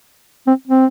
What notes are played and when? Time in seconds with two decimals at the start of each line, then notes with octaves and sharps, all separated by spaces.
0.47 C4
0.68 C4